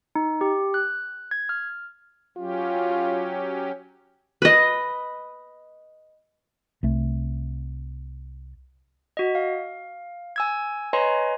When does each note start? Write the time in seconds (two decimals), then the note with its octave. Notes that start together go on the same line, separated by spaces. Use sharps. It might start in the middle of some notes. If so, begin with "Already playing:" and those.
0.15 D#4
0.41 G4
0.74 F#6
1.31 G#6
1.49 F6
2.37 F#3 C#4 F4 G4
4.42 B4 D#5
6.83 C2 A3
9.17 F#4 D#5
9.35 F5
10.36 G#5 E6 G#6
10.93 B4 C#5 D#5 G#5 A#5 C6